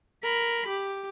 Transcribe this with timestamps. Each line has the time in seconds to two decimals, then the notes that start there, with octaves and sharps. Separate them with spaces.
0.23 A#4 B5
0.68 G4